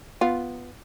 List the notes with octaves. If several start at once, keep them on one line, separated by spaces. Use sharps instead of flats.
B3 F4